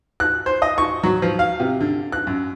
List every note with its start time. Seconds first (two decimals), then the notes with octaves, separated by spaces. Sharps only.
0.20 F#6
0.46 C5
0.62 D#5
0.78 C#6
1.03 F#3
1.22 F3
1.39 F5
1.60 C3
1.81 D3
2.12 F#6
2.27 F#2